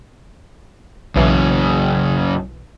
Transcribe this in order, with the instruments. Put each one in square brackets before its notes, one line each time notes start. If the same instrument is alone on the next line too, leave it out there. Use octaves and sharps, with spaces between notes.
[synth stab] B1 E3 [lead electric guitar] F#2 C#3